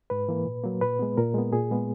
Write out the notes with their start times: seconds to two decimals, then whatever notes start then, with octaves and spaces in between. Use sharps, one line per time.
0.10 G#2 B4
0.29 E3 A#3
0.46 A#2
0.64 F#3 A#3
0.81 A#2 B4
0.99 G#3 B3
1.18 A#2 A#4
1.34 G#3 B3
1.53 A#2 G#4
1.71 G#3 B3